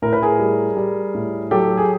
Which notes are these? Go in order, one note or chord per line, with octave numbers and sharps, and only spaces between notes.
A2 A#4
B4
G#4 A#4
G3
G3
A2
F#3 G4 A4
G#4